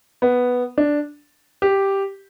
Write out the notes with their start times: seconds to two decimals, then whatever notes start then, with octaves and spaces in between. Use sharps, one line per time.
0.22 B3
0.78 D4
1.62 G4